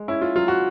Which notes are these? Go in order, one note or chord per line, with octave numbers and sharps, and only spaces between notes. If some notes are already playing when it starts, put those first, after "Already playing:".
Already playing: G#3
C#4 E4
F4
F#3 F4
F#4